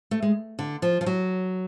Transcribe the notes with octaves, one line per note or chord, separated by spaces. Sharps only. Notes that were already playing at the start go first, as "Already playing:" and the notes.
A3
G#3
D3
F3
F3
F#3